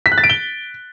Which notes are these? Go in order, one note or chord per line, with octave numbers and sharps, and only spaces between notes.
B6
F#6
A6
D7
G7